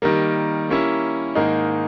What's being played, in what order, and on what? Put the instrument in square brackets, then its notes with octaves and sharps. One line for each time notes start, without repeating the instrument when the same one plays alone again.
[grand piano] D#3 G3 A#3
G3 A#3 C#4 E4
G#2 D#3 A#3 D#4 G#4